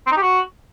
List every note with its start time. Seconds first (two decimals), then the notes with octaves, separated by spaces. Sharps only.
0.06 C4
0.11 D#4
0.17 G4
0.22 F#4